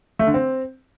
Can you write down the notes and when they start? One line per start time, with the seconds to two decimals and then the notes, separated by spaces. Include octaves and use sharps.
0.19 A3
0.27 D3
0.34 C4